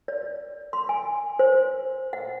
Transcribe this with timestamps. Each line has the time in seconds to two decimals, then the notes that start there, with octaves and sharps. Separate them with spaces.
0.08 D5
0.73 C6
0.89 G#5
1.39 C5
2.13 F#5